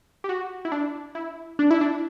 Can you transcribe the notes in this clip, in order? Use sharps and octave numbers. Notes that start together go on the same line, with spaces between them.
G4
F#4
E4
D4
E4
D4
E4
D4